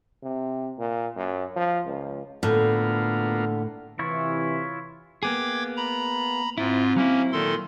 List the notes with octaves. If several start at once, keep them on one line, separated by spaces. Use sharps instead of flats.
C3
A#2
F#2
F3
C#2
A2 D3 A#3 B3 F4
C3 E3 E4 F4 C#5
A#3 B3 G#4 G5 D6 G#6
A#5 B5
G#2 C4 E4 F4
F#3 A#3 C#4 E4
A#2 D#3 A4 C6